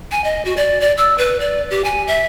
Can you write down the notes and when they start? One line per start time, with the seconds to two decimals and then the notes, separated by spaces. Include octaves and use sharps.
0.11 G#5
0.24 D#5
0.45 F#4
0.57 D5
0.81 D5
0.97 E6
1.18 B4
1.40 D5
1.70 G4
1.84 G#5
2.07 E5